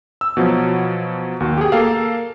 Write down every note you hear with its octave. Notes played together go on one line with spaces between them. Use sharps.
E6
B2 F3 F#3
D#2 F#4
G4 G#4
A#3 A4 F5